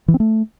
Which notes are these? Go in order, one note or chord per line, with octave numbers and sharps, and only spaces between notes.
E3
C4
A3